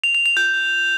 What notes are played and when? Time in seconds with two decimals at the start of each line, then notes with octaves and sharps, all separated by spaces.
0.04 F7
0.15 F7
0.26 F7
0.37 G6